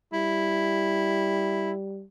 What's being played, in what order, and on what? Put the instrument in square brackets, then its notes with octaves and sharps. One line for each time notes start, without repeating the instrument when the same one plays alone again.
[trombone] G3 [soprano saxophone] E4